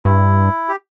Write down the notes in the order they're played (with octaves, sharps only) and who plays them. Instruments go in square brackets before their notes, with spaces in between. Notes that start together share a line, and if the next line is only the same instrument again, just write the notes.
[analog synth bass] G2 [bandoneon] E4
[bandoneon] G4